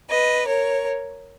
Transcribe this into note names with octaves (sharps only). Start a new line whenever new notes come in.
B4 D#5
A#4 C#5